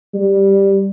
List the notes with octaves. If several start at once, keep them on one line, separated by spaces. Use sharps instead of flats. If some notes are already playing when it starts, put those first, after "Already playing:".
G3